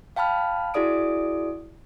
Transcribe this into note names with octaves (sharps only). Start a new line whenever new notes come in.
F5 G5 A5 B5 F6
E4 F#4 G#4 D5 D#6 D7